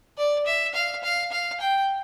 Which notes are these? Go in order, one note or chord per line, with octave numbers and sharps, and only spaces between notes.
D5
E5
F5
F5
F5
G5